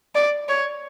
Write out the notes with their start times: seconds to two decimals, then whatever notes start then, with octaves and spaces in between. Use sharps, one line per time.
0.15 D5
0.49 C#5